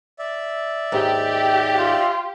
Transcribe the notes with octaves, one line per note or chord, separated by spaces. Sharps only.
D5 E5
D#2 G#2 G4
F4